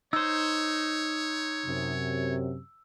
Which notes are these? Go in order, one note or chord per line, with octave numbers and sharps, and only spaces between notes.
D#4 C5 C#5 E6
F#2 C3